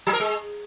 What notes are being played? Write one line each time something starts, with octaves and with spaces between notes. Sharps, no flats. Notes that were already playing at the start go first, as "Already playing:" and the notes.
F#3
A#4
G#3